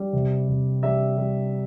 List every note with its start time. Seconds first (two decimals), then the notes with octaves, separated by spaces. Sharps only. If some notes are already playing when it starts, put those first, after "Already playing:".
Already playing: G3
0.13 C3
0.48 C3
0.83 G3 E5
1.17 G3